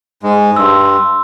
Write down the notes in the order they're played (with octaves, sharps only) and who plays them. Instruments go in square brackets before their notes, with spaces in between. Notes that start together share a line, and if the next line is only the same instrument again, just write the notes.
[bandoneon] G#2 G#3
[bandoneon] G2 [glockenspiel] C6 E6